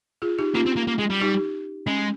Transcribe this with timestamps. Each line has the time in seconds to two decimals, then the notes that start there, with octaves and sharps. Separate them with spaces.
0.22 F4 G#4
0.39 D#4 G4
0.55 A#3 C#4 F4
0.66 C4
0.77 A#3
0.88 A#3
0.99 G#3
1.10 G3
1.21 D#4 G4
1.87 G#3 C#4